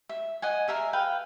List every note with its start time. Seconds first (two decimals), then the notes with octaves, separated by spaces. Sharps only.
0.09 E5
0.42 D#5 F#5 G#5
0.68 G#4 A#4 E5 G#5
0.93 B4 F5 G5